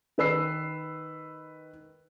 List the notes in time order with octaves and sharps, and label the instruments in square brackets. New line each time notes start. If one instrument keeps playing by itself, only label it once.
[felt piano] D#3 B4 E6 C7